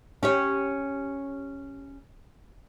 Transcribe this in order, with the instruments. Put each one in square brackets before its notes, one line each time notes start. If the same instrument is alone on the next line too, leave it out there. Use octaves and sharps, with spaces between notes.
[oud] C#4 G4 C#5